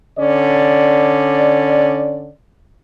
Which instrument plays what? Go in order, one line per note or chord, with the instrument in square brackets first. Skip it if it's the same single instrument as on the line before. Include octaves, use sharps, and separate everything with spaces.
[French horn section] D3 C#4 D5